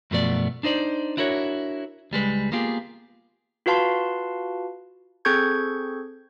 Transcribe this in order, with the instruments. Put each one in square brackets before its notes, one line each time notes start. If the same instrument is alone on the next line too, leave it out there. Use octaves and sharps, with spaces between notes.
[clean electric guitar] F#2 B2 F3 A3 B3 D5
D4 D#4 C5 D5
D4 E4 F#4 A#4 C#5
C#2 G3 G#3 B4
A#3 B3 F4 G4 G#4
[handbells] F4 F#4 B4 F5 A5 C6
C4 G#4 A4 C#6 G6 G#6